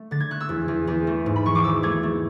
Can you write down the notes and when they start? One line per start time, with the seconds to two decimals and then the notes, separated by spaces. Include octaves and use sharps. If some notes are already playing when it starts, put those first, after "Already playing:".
Already playing: A3
0.11 D3 A6
0.20 G#6
0.31 A3 F#6
0.41 E6
0.49 E2
0.68 E2
0.87 E2
1.07 A3
1.26 G#2
1.36 B5
1.46 E3 C#6
1.55 D6
1.64 G#1 E6
1.83 A3 G#6
2.03 A3